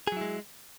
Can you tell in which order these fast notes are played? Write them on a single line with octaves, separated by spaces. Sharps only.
G#4 F#3 E4 G#3